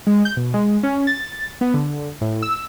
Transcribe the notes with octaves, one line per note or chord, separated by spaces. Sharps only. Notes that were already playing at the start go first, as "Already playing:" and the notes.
G#3
G6
B2
G#3
C#4
A6
B3
D3
A2
E6